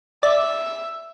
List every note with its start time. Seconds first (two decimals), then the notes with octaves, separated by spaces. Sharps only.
0.23 D5 E5